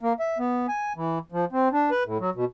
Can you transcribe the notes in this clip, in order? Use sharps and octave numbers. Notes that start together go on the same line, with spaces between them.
A#3
E5
B3
G#5
E3
F3
C4
D4
B4
A2
F#3
B2